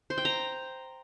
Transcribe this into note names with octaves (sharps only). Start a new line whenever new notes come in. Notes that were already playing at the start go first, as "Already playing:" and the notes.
C5
G5
A#5